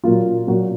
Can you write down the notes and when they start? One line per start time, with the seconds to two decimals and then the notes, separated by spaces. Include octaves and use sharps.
0.04 A#2 F#3 A#3 F4
0.47 A#2 F#3 A#3 F#4